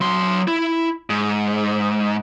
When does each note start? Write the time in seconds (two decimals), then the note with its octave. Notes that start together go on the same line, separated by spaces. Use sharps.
0.01 F#3 C6
0.48 E4
1.10 G#2